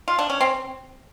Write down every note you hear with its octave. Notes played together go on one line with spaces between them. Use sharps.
F4
D4
C#4
C4